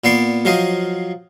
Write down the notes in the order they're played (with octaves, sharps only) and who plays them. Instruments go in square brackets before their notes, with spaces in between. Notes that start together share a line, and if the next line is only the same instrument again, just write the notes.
[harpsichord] A#2 B3 D5 C6 C#6
F3 F#3 F4 C5 D#5